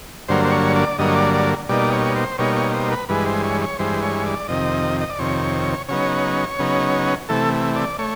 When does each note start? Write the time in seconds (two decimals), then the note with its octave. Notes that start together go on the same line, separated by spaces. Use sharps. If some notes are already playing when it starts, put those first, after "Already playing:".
0.28 G2 D3 F#3 A#3 C5
0.45 C5
0.52 C#5
0.76 D5
0.99 G2 D3 F#3 A#3 D#5
1.08 C#5
1.16 D5
1.34 D5
1.69 B2 G3 A#3 D#4 D5
1.92 C#5
2.16 C5
2.38 B2 G3 A#3 D#4 C#5
2.56 C#5
2.74 C5
2.92 B4
3.09 G2 E3 G#3 B4
3.26 C5
3.44 C#5
3.61 C#5
3.79 G2 E3 G#3 C5
4.03 C#5
4.26 D5
4.48 F2 C3 D#3 D#5
5.01 D#5
5.10 D5
5.19 F2 C3 D#3 C#5
5.88 C#3 F#3 B3 D#4 C#5
6.59 C#3 F#3 B3 D#4
7.29 C3 E3 A3 A4
7.76 D5
7.99 A3 C#5